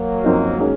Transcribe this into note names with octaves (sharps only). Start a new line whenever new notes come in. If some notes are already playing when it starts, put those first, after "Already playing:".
Already playing: F#3 A#3
F#2 F3 C4 D#4 F#4
D#3 G#3 C#4